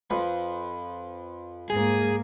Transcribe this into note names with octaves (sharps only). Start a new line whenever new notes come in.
F2 B4 B5
G#2 A#3 G#4